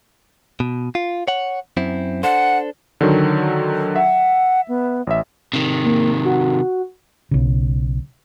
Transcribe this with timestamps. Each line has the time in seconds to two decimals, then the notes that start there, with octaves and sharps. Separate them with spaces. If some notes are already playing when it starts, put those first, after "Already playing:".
0.60 B2
0.95 F4
1.28 C#5 F#5
1.77 F#2 C4 E4
2.23 D4 A4 C5 F#5
3.01 D3 D#3 F#3
3.96 E5 F#5
4.68 B3
5.07 A1 E5
5.53 C3 D#3
5.85 A#3
6.25 F#4
7.31 B1 C#3